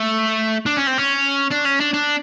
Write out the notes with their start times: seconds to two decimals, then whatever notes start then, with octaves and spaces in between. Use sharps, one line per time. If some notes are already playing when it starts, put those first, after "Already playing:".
Already playing: A3
0.66 D4
0.77 C#4
0.87 C4
0.98 C#4
1.51 D4
1.66 C#4
1.80 D4
1.94 D4